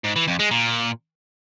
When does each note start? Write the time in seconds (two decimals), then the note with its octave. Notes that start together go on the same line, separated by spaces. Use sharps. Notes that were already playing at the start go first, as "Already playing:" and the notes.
0.04 G#2
0.16 E3
0.28 F2
0.39 G#3
0.51 A#2